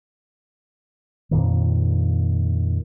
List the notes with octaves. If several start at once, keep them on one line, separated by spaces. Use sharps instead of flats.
F2 A#2 D#3